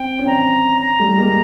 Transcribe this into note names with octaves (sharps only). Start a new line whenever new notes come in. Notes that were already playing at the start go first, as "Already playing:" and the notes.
Already playing: C4 G5
C#4
C4 D4 A#5
A#5
G3 A3
G#3 A#3